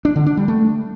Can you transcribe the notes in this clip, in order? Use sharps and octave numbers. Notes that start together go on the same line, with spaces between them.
D4
D3
D4
G3
A3